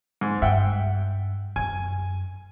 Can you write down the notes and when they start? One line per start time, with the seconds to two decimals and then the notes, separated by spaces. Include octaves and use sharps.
0.21 G#2
0.42 G2 E5 F#5 G5
1.56 F#2 G#5